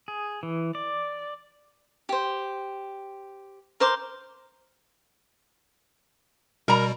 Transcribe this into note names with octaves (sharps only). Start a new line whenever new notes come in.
G#4
E3
D5
G4 C5
A#4 C5 C6 D6
B2 G3 A#4 A#5